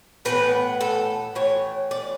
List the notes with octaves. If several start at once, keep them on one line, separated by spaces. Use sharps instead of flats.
A2 E3 B3 B4
A4
A2 E3 C#5
D5